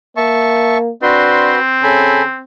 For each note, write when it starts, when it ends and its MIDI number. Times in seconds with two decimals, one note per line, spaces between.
0.17 0.91 58
0.17 0.78 76
0.17 0.78 81
0.17 0.78 85
1.02 2.44 60
1.02 1.53 62
1.02 1.59 66
1.02 1.59 71
1.02 1.59 84
1.83 2.23 49
1.83 2.22 69
1.83 2.22 80
1.83 2.22 83